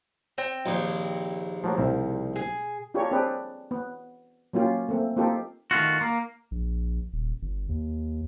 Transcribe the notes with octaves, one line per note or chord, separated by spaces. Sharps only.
C4 G5
A#1 D#2
F3 F#3 A3 A#3
C2 B2 C4 A#4
G#4
D4 F4 G4 G#4 A#4 C#5
C4 D4 G4 G#4 B4
B3
F#3 A#3 C#4 F4 G4
A3 A#3 C4
A#3 C4 D#4 F4 G4 A4
D#3 A3 F4 F#4
A#3
A#1
D#1
G1
D#2